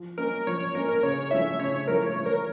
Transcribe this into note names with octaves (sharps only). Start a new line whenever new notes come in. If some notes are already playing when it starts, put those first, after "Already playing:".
Already playing: F3
A#3 C#4 A#4
F3 C#5
C#5
A#3 C#4 A#4
A#4
C#3 C#5
F3 A3 C#4 E4 E5
C#3 C#5
C#5
F3 A3 C#4 E4 A#4
C#5
E3 C#5
A#4